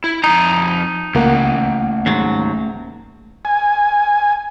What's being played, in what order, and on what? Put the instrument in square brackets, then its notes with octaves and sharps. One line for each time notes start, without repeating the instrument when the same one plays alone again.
[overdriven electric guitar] E4
[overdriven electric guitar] F2 A#5 [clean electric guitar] D#4
[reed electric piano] C#2 A#3 F#5 [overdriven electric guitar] A3 C#4
[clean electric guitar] D#2 G#2 F#3
[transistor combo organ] G#5